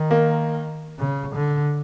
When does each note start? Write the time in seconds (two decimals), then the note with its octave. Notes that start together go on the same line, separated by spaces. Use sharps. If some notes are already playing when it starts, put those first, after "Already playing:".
Already playing: D#3
0.11 A#3
0.99 C#3
1.36 D3